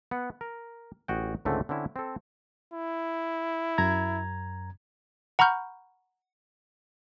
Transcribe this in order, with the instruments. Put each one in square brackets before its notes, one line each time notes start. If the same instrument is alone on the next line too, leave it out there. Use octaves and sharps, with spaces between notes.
[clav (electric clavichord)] B3 F#5
A#4
A1 F#4 G#4 G5
C#2 G#2 D3 A3 C4
D3 C4 C#4 E4
C4 A4
[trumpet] E4
[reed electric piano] F#2 A#5 G#6
[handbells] F#5 A#5 B5 C#6 F6 G6